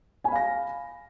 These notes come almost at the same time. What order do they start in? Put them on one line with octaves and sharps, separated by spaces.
G#5 B5 F5 A#6